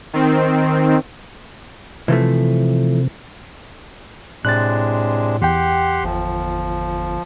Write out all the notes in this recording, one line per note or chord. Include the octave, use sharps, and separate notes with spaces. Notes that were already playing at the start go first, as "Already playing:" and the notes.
D#3 C4
C3 E3 F3 A3
A2 C3 G#3 D4 F#6 A6
E2 G4 F#5 G5 C6
G1 F3